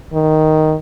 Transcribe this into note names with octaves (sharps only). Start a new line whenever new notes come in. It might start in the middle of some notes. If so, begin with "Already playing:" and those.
D#3